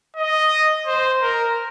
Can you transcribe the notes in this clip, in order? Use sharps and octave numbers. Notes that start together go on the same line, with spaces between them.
D#5
C5
A#4